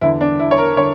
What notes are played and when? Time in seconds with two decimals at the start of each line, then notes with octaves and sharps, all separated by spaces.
0.01 E2 D3 E4
0.21 D4
0.39 E4
0.51 C#5
0.58 A#4
0.77 D3 C#5